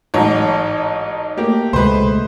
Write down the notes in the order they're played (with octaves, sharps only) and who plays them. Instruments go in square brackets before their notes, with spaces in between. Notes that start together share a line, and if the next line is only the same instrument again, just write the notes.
[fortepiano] A1 G#2 [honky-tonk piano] F#3 D#4 C#5
[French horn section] A3 [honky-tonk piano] A#3 [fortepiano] G4
[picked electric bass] C#2 B2 G#3 [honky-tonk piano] B4 C5